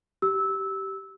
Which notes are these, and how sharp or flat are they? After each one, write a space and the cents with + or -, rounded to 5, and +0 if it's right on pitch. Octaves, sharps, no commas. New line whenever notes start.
G4 -15 E6 -15